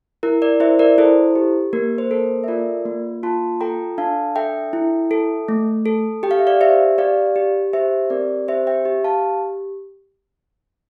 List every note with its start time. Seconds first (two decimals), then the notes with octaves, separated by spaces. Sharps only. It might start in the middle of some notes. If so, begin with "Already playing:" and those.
0.23 E4 A#4
0.42 A#4 D5
0.60 E4 C5 E5
0.79 A#4 D5
0.98 E4 A4 C5
1.35 G4
1.73 A#3 A#4
1.98 C5
2.11 A4 A#4
2.44 E5
2.48 F4 A#4 D5
2.86 A#3
3.23 F4 A5 C6
3.61 A4 G5 A#5
3.98 D4 F5 A5
4.36 A4 E5 G5
4.73 E4
5.11 A4
5.48 A3
5.86 A4
6.23 G4 G5
6.31 F5
6.39 E5
6.47 D5 F5
6.61 G4 C5 E5
6.98 G4 D5 F5
7.36 G4
7.73 G4 C5 E5
8.10 C4 A#4 D5
8.48 G4 C5 E5
8.67 E5 G5
8.85 G4
9.04 F5 A5